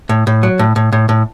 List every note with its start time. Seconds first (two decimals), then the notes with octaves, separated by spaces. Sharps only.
0.09 A2
0.27 A2
0.43 F#3
0.59 A2
0.76 A2
0.92 A2
1.09 A2